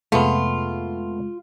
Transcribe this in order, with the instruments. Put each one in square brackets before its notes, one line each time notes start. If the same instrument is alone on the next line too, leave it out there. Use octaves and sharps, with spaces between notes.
[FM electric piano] F2 C3 G#3 [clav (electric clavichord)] A3 B3 [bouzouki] F4